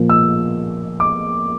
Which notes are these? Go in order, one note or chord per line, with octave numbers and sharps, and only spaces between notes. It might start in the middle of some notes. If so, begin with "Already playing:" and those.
Already playing: A#2 F3 A#3
E6
D6